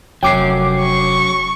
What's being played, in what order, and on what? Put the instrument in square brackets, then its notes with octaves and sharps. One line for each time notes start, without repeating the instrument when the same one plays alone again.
[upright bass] F1 [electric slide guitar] F#3 C#4 [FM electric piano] G5 D6 C7
[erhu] C#6